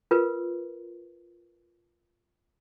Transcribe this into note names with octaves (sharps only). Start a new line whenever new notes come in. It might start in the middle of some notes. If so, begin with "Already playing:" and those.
F4 A#4 B4